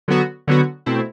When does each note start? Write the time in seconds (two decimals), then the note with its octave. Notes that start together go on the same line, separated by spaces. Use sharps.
0.08 D3 F#3 B3 F#4
0.48 D3 F#3 B3 F#4
0.86 B2 A3 C4 E4